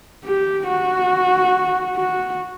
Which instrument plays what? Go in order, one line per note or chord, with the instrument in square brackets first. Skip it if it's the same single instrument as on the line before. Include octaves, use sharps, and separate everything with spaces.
[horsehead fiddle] G4
F#4
F#4